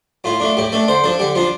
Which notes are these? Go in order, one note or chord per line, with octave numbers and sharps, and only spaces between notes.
A2 F4
A3 D4
A2 G4
A3 D4 A4
D3 C5
F3 D4 A4
D3 G4
F3 D4 F4